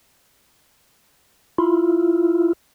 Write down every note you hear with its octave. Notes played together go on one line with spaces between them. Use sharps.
E4 F4